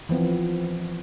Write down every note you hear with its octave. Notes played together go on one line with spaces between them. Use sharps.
E3 F3 B3 C4